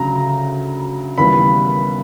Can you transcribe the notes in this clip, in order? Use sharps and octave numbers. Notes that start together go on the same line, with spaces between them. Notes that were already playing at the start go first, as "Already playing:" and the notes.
Already playing: D2 C#3 F#3 A#5
D#2 C#3 E3 G3 B3 B5